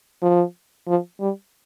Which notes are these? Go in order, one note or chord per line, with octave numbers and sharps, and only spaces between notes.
F3
F3
G3